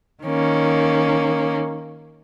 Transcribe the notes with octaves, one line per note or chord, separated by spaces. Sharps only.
D#3 A#3 C#4